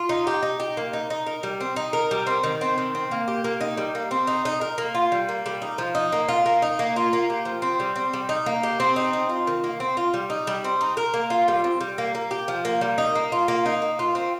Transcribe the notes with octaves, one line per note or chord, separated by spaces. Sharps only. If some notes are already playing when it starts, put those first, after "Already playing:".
Already playing: F4
D#4
G4
D#4
G4
A#3
D#4
D#4
A#4
G3
C4
D#4
A#4
G3
C4
D#3
C4
D#3
C4
A#3
G4
A#3
D#4
G3
A#3
C4
D#4
D#4
A#4
A#3
F4
G3
A#3
G3
D#4
F3
D#4
A#3
F4
A#3
D#4
A#3
F4
A#3
G4
F3
C4
G3
C4
G3
D#4
A#3
G4
C4
D#4
C4
F4
D#3
A#3
C4
F4
G3
D#4
G3
C4
D#4
A#4
A#3
F4
G3
C4
G3
A#3
A#3
G4
F3
A#3
G3
D#4
A#3
F4
A#3
D#4
A#3
F4
C4